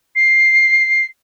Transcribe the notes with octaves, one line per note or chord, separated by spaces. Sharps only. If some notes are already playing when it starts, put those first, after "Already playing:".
C7